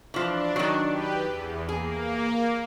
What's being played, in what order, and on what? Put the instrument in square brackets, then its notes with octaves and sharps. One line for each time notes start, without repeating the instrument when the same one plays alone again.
[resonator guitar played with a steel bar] E3 F3 [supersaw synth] D4
[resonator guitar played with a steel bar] D#3 F#3
[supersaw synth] G4 B4
E2
[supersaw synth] A#3 [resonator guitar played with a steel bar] G#4